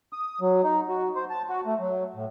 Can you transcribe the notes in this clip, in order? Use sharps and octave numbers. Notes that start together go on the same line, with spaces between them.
D#6
F#3
D#4
F#4
C5
A5
F#4
A3
F#3
A2